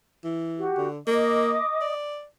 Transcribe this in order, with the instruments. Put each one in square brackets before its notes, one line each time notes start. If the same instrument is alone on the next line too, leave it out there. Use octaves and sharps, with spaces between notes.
[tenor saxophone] E3
[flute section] F#4 G4
[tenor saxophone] D3
[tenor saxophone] A#3 [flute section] D#5 D6 D#6
[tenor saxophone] D5